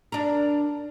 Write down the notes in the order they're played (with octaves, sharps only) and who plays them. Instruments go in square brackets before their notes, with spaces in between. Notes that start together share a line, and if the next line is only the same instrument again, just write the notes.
[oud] D4 A#4